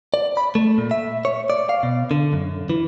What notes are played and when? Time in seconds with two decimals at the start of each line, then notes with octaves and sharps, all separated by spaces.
0.14 D5
0.37 B5
0.55 A3
0.78 A#2
0.91 E5
1.25 C#5
1.50 D5
1.69 F5
1.83 B2
2.11 D3
2.33 F#2
2.70 E3